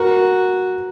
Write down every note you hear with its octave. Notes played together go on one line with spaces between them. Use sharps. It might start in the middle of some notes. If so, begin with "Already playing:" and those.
Already playing: F#4 A#4